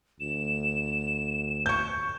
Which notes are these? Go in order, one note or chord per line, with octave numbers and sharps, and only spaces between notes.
D2 E7
C#6 G6